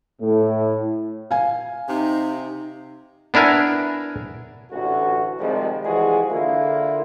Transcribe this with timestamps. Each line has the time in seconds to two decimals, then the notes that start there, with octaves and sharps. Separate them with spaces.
0.21 A2
1.31 F5 G#5
1.89 C3 D#4
3.34 B3 D4 E4 A#4 G#5
4.72 A1 D2 F#4
5.40 C3 D#3 F3 G3 G#3
5.84 E3 F3 G3 G#3 F#4 G#4
6.30 D3 A#3 E4 F4